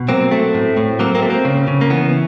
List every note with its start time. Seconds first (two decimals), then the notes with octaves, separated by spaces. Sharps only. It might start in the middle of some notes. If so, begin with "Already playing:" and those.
Already playing: B2
0.09 F#3 A#3 C4
0.31 A3
0.54 A2
0.77 A2
0.99 F#3 A#3 C4
1.15 A#3 C4
1.22 A3
1.30 A#3 C4
1.45 C#3
1.68 C#3
1.81 A#3
1.90 E3 B3